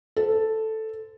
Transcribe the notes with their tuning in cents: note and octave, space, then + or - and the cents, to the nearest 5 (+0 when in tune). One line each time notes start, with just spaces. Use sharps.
A4 +0 C5 -30